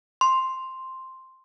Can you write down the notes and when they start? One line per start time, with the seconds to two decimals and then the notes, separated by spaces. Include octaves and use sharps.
0.21 C6